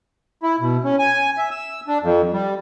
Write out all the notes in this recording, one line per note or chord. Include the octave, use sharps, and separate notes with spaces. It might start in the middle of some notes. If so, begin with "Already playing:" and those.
E4
B2
C#4
G#5
E5
E6
D4
F2
G3